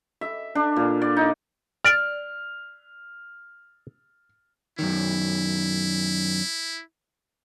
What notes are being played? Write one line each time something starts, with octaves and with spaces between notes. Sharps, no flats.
E5
D4
A#2
D5
D#4
D5 F6
F#2 D#3 E4